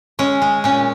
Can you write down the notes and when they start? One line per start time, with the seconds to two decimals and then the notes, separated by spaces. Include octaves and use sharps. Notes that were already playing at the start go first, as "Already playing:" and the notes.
0.19 G#3 C#4
0.42 G#3
0.64 A#2 C#4